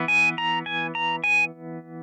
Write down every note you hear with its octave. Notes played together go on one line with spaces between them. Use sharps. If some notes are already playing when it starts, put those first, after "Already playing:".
Already playing: E3 B3
G#5
A#5
G#5
A#5
G#5